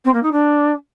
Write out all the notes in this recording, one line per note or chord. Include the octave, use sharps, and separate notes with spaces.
C4
A#3
D#4
D4